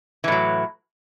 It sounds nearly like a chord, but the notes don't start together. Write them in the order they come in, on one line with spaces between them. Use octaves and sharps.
E3 A2 F#3